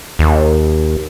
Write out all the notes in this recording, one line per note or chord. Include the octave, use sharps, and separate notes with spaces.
D#2